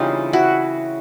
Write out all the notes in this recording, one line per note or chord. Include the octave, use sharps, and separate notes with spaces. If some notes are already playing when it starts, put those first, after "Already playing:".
Already playing: C#3 E3 G3 C4 D#4 F4
E4 F#4